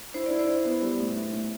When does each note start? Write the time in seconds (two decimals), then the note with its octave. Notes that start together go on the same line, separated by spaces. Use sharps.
0.14 E4 C5
0.26 E4 D5
0.39 C5
0.48 E4
0.65 B3
0.82 G3
1.00 A2
1.16 A2
1.33 A2